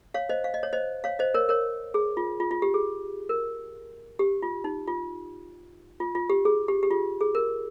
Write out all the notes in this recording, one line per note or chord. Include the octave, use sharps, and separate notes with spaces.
C#5 F5
C5 D#5
F5
D#5
C#5
C5 D#5
C#5 F5
C5 D#5
A#4 C#5
A#4 C#5
G#4
F4
F4
F4
G4
G#4
A#4
G4
F4
D#4
F4
F4
F4
G4
G#4
G4
G4
F4
G#4
A#4